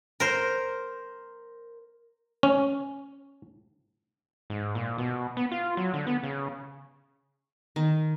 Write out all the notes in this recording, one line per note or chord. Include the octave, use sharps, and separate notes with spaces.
A#4 C5
C#4
G#2
A#2
B2
B3
F4
F#3
D3
B3
C#3
D#3